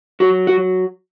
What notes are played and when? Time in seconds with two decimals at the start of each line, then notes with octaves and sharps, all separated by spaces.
0.20 F#3 F#4
0.47 F#4